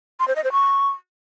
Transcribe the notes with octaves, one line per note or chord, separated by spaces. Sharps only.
C6
C5
D#5
C5
C#6